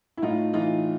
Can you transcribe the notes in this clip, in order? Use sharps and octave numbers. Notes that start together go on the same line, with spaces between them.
E4
A2 D#4 F4
E3 D#4 F4